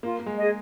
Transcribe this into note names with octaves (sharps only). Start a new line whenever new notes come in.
A#3 F4
A#3
G#3
G#4 D#5